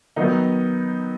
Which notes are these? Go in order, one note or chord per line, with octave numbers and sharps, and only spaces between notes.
D#3 F#3 B3 D#4